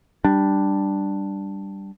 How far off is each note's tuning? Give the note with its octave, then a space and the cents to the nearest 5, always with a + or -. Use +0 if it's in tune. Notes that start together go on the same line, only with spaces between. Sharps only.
G3 +0 D4 +0